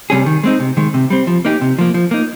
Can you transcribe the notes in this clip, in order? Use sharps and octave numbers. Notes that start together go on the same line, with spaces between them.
C3 G3 C#4 G#4
D#3
G#3 C4 D#4
C3
D#3 G#3
C3
G3 C4
F3
A#3 D#4 G4
C3
F3 A#3
F3
A#3 D#4